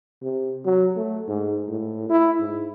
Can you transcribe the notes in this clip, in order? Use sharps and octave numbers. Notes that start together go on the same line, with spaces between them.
C3
F#3
A3
G#2
A2
E4
G#2